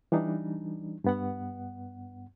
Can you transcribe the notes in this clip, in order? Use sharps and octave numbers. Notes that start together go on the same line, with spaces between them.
E3 G3 D4 D#4
G2 B3 F#5